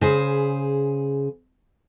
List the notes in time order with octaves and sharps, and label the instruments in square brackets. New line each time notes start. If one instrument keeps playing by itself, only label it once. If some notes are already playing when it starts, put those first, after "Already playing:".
[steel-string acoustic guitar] C#3 G#4 C5